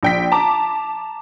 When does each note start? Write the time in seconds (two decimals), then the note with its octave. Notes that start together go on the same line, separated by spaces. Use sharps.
0.03 A#1 G5 B6
0.32 A5 A#5 D6